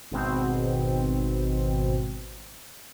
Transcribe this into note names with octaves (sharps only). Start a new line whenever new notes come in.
G#1 B2 C4